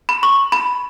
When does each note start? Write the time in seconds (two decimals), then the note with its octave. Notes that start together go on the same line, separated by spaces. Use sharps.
0.09 B5
0.23 C#6
0.52 B5